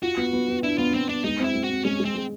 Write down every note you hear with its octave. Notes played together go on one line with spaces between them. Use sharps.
F4 F#4
B3
B3
B3
D4 E4
B3 F4
B3 C4
B3 D4
G#3 D#4
C4 E4
G#3
F#4
C4
G#3 C#4
G#3
C4
G#3